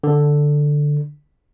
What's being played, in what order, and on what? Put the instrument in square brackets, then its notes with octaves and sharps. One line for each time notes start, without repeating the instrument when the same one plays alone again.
[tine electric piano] D3